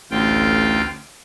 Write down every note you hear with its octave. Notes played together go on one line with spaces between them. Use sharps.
A1 D2 F4 G5